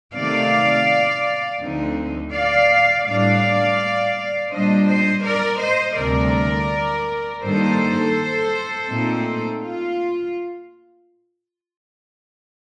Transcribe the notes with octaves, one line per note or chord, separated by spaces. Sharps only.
C3 D#3 A3 D5 F5
D2 D3 F3 C4 D#4
D5 F5
A2 G3 D4 D5 F5
A#2 G3 D4 C5 D#5
C5 D#5
A#4 D5
C5 D#5
D2 C3 G3 A#4 D5
G2 D#3 A#3 D#4 A4 C5
A#2 A3 C4 D#4
F4